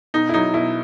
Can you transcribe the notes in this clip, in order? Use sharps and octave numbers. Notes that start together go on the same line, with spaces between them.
B2 D#4
E4
F#3 D#4
B2 E4